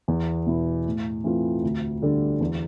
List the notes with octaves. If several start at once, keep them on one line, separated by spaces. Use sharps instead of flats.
E2
B2 B3 E4
A2
E3 A3 C4 F4
D2
D3 G3 D4 A4
E2